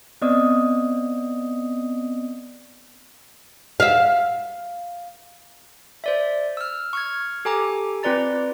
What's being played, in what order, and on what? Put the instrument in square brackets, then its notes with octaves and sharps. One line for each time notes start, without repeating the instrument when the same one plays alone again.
[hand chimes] B3 C4 D5 D#5 D#6
[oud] E5 F5
[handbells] C5 D5 E5
E6 F6
C#6 F6 G#6
G4 A4 G#5 A#5 D6
C4 F4 B4 D5 A#5 A6